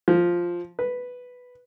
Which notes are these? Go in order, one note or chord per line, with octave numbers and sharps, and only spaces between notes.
F3
B4